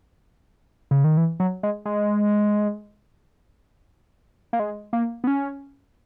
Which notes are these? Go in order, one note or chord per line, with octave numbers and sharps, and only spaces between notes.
C#3
D#3
E3
F#3
G#3
G#3
A#3
G#3
A#3
B3
C#4